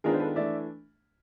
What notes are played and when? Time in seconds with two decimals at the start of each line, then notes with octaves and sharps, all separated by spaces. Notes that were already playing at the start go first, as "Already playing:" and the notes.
0.04 D#3 G#3 B3 D4 F4 G#4 A#4
0.13 C5
0.20 A4 B4
0.36 E3 A3 D4 D5 E5